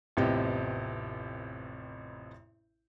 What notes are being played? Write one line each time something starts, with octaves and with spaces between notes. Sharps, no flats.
A1 F2 C3 B3 G4 D#5